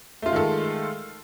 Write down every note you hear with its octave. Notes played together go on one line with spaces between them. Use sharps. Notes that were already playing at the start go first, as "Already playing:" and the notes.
D#3 G#3 A3 F4 A4